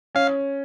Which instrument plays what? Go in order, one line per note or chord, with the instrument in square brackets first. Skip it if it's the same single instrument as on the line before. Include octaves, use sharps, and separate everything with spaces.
[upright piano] C#4 [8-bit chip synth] F5